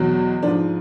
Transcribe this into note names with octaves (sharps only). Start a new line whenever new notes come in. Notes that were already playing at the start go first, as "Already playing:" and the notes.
Already playing: E2 B2 F#3
G#2 F3 D4